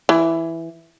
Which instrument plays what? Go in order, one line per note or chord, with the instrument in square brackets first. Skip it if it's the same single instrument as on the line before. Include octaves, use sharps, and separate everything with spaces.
[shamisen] E3